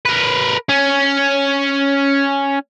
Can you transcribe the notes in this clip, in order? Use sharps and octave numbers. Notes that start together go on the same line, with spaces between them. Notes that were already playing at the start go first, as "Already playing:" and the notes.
A#4 B4
C#4